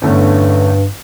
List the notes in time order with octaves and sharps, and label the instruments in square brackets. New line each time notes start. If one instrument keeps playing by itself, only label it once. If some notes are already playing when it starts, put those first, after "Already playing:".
[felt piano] E2 D3 A3 C#4 [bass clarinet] G2